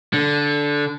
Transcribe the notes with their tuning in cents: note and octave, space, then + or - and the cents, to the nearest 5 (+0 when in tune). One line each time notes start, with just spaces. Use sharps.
D3 -10